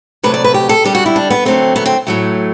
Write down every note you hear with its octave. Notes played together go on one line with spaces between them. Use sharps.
C3 F#3 A3 B4
D5
B4
G4
A4
D3 G3 G4
F#4
E4
D4
B3
D3 F#3 A3 C4
B3
C4
A2 F#3 A3